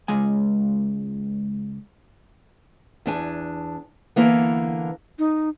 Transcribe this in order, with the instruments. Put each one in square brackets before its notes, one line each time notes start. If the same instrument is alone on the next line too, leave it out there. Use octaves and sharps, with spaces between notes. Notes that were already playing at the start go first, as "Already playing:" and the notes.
[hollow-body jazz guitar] C#2 G#3 G#5
[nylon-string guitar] E2 D4 G#5
D3 E3 A#3 B3
[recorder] D#4